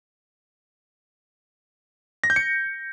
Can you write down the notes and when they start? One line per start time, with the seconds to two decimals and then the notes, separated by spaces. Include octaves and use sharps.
2.24 A#6
2.30 G6
2.36 C#7